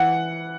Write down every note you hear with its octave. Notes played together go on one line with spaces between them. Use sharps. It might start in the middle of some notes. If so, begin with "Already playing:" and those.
Already playing: E3 F#5